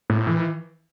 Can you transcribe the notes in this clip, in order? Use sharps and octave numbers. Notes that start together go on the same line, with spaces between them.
A2
E3